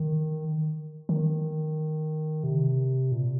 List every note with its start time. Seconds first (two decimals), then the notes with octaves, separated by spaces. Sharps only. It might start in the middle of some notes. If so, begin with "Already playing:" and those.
Already playing: D#3
1.09 D#3
2.43 C3
3.12 A#2